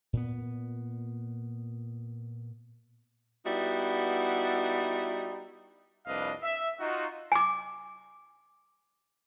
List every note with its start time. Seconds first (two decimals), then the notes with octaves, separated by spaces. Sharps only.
0.13 A#2 B3
3.45 G3 B3 D#4 E4 F#4
6.06 C2 F2 D4 B4 D#5 F5
6.43 E5
6.80 D#4 F4 F#4
7.32 G#5 D6